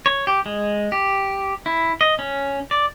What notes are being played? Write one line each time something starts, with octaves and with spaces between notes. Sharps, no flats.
C#5
G4
G#3
G4
E4
D#5
C#4
D5